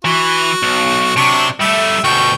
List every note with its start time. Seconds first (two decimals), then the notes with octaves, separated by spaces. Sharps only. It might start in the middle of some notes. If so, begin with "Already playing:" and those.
0.05 E3 F#4
0.63 B1
1.16 C3 F#3 D4 C#6
1.61 G3 A3 E5
2.04 D2 B2 G5 C#6